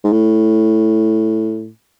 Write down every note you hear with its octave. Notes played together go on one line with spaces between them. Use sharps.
G#2
A2